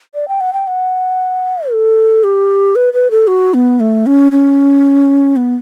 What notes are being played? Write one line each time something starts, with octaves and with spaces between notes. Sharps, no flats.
D5
G5
F#5
G5
F#5
A4
G4
B4
B4
A4
F#4
B3
A3
C#4
C#4
B3